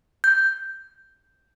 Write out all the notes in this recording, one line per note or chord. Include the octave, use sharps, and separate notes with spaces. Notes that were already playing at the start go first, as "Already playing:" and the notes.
G6